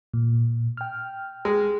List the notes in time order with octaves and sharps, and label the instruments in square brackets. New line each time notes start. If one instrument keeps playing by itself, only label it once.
[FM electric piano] A#2
G5 F6
[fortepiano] G#3